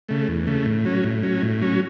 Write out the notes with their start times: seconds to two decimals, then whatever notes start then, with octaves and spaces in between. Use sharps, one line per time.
0.09 C#3 A3
0.28 E2
0.47 C#3 A3
0.66 A2
0.85 F#3 C#4
1.04 A2
1.23 F#3 C#4
1.43 A2
1.61 F#3 C#4